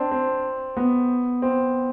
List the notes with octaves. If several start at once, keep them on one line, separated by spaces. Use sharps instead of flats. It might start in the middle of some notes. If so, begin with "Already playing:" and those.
Already playing: C4 D4
C4
B3
C4